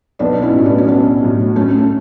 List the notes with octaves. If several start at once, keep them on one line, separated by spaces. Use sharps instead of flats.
B1 B3 D4
C#4 E4
A2 F#3
B3 D4
C#4
B1 B3 D4
A2 F#3
D2 A3 C#4
A3 C#4